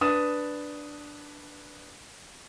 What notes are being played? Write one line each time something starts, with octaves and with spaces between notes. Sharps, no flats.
D4 B4 D#6 A6 E7